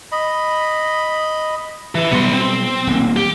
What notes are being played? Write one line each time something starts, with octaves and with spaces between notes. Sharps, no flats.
D#5 B5
E3
B2 F#3 G3 B3 C6
C4
D#1 B1 A#3
G4